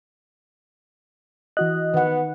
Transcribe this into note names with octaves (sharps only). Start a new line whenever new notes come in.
E3 F#4 D#5 F#6
D#3 B3 F#5